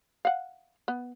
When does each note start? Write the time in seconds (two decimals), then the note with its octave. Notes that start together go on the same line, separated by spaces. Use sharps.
0.25 F5 F#5
0.88 B3